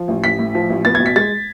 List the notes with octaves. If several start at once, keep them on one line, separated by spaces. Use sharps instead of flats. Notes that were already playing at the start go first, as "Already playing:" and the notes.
Already playing: F3
A1
A1 B6
A2
F3
A1
B3 A6
G#6
B2
B6
G#3 A6